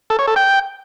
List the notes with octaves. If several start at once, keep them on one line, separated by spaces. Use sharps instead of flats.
A4
C#5
A4
G5